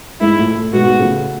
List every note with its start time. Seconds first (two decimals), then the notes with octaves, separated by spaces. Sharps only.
0.21 G#2 E4
0.39 A2
0.56 A2
0.73 G#2 B2 F#4
1.00 A2 C#3